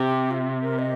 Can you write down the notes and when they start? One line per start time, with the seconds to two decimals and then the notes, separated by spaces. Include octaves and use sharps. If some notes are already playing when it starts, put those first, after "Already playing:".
Already playing: C3 G4
0.31 F4
0.62 A#4
0.79 D#5